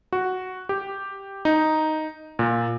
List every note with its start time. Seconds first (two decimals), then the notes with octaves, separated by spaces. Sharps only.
0.13 F#4
0.69 G4
1.45 D#4
2.39 A#2